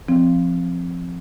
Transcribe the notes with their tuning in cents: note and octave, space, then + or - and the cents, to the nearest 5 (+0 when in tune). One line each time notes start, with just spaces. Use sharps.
F3 -10 C4 +0